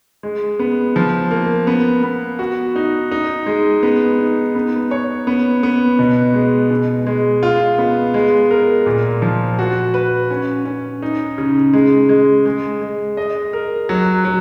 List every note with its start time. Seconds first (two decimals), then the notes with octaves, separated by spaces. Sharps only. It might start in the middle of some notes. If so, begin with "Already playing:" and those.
0.23 G#3
0.59 B3
0.96 F3
1.31 A#3
1.67 B3
2.03 B3
2.39 F#4
2.76 D#4
3.12 D#4
3.46 G#3
3.83 B3
4.19 D#4
4.55 B3
4.91 C#5
5.27 B3
5.63 B3
5.99 B2
6.34 G#3
6.70 B2
7.07 G#3
7.43 F4
7.78 B3
8.14 G#3
8.51 A#4
8.86 A#2
9.22 F3
9.59 F#4
9.94 B4
10.30 C#4
10.65 C#4
11.02 D#4
11.38 C#3
11.73 G#3
12.09 G#3
12.46 G#3
12.82 G#3
13.17 D#5
13.53 A#4
13.89 F#3
14.25 F#3